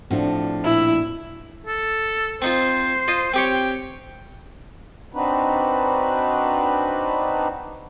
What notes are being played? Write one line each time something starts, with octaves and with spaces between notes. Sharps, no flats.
A2 F3 C4 D4 F#4
A#2 E4
A4
C4 D#4 F4 C5
F4 D#5
C4 G4 C#5 G5
C4 D4 D#4 F#4 B4